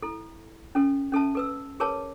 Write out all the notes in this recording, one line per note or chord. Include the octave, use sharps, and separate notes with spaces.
E4 A4
C#4 A4
C#4 A4 E5 A5
A4 B4 E6
G#4 A#4 B4 C#5 A5